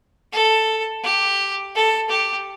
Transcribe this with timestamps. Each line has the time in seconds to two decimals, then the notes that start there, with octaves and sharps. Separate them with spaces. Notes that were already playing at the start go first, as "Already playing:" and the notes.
0.33 A4
1.03 G4
1.75 A4
2.09 G4